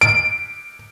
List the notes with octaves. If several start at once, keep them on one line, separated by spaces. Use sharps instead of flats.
D7